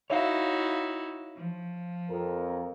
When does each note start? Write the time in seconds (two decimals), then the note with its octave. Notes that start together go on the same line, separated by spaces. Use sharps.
0.10 D#4 E4 F#4 C#5 E5 F5
1.36 F3
2.11 F2 A#4